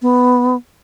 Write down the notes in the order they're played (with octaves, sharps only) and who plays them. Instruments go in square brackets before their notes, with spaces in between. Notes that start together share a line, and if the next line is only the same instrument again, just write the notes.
[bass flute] B3